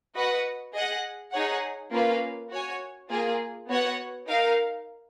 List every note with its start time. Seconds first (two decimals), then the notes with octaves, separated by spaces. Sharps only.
0.15 F#4 B4 D#5 F#5
0.73 G#4 D#5 F#5
1.32 D#4 G#4 C#5 F#5
1.91 A#3 C#4 F4 B4 F5
2.51 F#4 C#5 G#5
3.10 A#3 F4 G#4
3.69 B3 F#4 C#5 F#5
4.27 D#4 A#4 F5